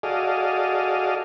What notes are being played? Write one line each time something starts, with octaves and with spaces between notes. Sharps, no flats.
F#4 G#4 A4 D5 D#5 F5